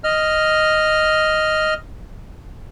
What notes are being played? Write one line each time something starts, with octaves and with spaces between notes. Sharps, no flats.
D#5 F6